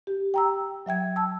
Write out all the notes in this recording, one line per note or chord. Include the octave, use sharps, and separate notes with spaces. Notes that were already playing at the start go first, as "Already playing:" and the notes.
G4
G5 A#5 E6
F#3 E5 G5 G#6
A5 E6